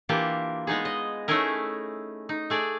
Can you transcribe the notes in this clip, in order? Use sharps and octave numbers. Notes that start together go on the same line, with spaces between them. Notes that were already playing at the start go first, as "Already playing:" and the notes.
E3 A#3 D4 F4 G4
G#3 B3 D#4 G#4
D#5
A3 C#4 D#4 E4 G#4 A#4
D#4
A3 G#4 D5